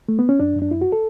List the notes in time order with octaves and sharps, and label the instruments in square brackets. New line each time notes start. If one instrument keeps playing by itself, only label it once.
[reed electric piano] A3
B3
C#4
F#2 D4
F#2
D4
F#2 E4
F#4
A4